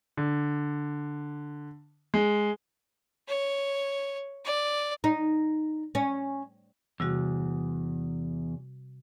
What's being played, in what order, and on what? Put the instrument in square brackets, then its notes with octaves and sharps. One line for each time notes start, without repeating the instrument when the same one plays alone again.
[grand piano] D3
G#3
[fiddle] C#5
D5
[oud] D#4
C#4
[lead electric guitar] E2 [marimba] C3 G3 F#4